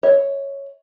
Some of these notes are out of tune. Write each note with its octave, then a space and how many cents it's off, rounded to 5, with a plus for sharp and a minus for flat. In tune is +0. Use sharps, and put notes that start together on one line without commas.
C#5 +0 E5 -30